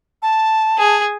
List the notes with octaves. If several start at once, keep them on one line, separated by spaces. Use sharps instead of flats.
A5
G#4